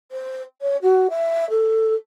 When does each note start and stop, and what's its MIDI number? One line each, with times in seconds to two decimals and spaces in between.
0.11 0.42 72
0.61 0.77 73
0.82 1.07 66
1.10 1.48 76
1.49 1.94 69